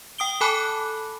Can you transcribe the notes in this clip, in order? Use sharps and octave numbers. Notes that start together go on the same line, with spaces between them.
G5 D#6 D7 G7
A4 G#5 A5 B5 D6 F#6